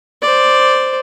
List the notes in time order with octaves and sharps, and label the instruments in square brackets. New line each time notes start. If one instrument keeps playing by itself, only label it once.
[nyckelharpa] C5 D5